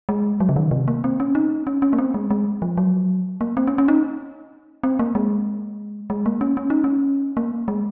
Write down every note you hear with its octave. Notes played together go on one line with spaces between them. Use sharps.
G#3
F#3
C#3
D#3
C3
A#3
C4
C#4
D#4
C#4
C#4
A#3
C4
G#3
G#3
F3
F#3
A#3
C4
C#4
C#4
D#4
C4
A#3
G#3
G#3
A#3
C#4
C#4
D#4
C#4
A#3
G#3